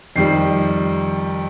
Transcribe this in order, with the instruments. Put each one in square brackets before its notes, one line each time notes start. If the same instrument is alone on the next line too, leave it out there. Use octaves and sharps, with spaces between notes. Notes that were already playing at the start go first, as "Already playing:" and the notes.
[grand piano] F2 D#3 G3 C7